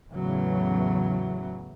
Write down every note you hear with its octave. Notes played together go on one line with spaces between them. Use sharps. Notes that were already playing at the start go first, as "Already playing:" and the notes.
E2 A2 C#3 E3 F#3